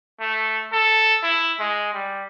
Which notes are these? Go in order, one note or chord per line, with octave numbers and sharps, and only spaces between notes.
A3
A4
E4
G#3
G3